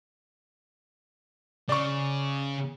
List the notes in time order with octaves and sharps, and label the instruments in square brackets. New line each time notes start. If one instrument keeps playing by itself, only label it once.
[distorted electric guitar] C#3 [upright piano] D5 C#6